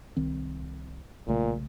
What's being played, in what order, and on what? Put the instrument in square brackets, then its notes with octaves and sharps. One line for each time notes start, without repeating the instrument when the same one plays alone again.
[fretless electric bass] C2 D#3 C4
[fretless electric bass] B1 C#3 A3 [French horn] A#2